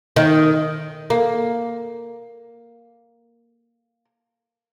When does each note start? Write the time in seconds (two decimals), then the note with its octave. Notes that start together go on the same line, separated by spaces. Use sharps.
0.16 D#3
1.10 A#3